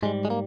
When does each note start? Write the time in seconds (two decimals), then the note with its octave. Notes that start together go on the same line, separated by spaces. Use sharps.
0.03 G#2 G3 G#3
0.25 G#3
0.30 A#3